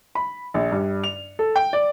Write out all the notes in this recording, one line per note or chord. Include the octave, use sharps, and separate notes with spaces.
B5
A#1
G2
F7
A4
G5
D5